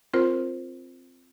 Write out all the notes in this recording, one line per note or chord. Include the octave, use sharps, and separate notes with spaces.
C4 F4 A#4 C5